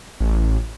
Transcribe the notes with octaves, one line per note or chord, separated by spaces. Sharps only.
A1